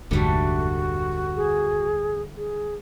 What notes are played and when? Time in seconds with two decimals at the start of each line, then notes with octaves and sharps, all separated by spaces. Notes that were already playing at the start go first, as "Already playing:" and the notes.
0.11 F1 D2 G#2 D3 G3 A3 F#4
1.36 G#4
2.37 G#4